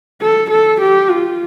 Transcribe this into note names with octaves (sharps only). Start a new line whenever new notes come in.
A4
A4
G4
F4